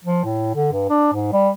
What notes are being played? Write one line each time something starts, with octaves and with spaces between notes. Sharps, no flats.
F3
A2
D3
G2
D4
G#2
G3